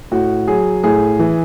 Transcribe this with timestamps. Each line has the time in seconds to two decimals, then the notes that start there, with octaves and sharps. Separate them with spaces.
0.12 A2 F#4
0.47 F#3 G#4
0.84 A2 G#4
1.19 E3